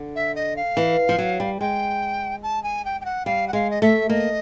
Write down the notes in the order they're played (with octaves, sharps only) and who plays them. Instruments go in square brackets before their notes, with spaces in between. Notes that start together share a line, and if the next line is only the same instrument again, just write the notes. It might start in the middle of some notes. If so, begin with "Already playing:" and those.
Already playing: [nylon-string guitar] D3
[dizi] E5
D#5
F5
[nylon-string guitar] E3
F3
F#3
G3
[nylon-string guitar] G#3 [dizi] G5
[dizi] A5
G#5
G5
G5
F#5
[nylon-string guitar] G3 [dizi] F5
[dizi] F#5
[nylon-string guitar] G#3 [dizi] F5
[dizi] D#5
[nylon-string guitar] A3 [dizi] E5
[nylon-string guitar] A#3 [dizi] D#5